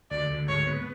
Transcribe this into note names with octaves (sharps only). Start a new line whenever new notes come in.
D2 D5
D2
G#2 C#5
B3